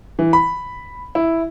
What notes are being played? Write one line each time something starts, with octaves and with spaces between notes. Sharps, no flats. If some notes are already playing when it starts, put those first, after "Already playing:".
E3
B5
E4